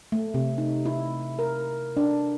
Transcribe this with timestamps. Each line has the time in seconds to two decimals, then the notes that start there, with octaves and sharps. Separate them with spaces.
0.12 A3
0.34 C3
0.58 D#4
0.86 E4
1.39 A#4
1.97 D4